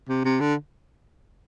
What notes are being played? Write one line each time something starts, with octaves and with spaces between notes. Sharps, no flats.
C3
C3
D3